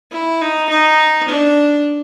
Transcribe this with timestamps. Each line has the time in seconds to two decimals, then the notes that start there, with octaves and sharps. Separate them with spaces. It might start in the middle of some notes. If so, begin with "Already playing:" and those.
0.12 E4
0.41 D#4
0.70 D#4
1.28 D4